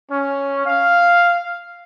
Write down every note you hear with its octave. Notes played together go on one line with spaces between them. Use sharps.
C#4
F5